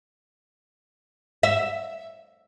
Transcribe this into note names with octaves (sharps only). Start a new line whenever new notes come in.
E5